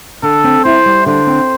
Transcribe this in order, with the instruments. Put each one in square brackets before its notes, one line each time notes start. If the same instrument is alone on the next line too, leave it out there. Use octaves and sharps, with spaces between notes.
[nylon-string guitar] D3 [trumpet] A4
[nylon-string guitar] C4
[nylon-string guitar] E4 [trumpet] C5
[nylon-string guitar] G3
[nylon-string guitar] D3 [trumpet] C5
[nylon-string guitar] C4